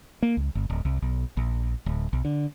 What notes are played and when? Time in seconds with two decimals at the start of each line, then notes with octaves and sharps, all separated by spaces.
0.23 A#3
0.37 C#2
0.55 G1
0.70 D1
0.85 C2
1.02 B1
1.37 A#1
1.86 D1
2.13 B1
2.25 D3